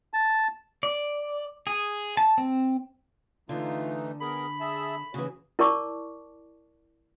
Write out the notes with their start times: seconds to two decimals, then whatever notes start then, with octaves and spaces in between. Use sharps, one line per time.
0.13 A5
0.83 D5
1.67 G#4
2.17 A5
2.38 C4
3.49 D3 E3 A3 D#4 F4
4.21 B3 G#4 A#4 B5
4.60 G#4 E5 A5
5.14 C#3 E3 F#4 G#4
5.59 E4 A#4 D5 A5 C#6 D6